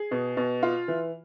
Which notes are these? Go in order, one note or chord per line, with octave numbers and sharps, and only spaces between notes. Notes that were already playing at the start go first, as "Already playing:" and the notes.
Already playing: G#4
B2
B2
F4
E3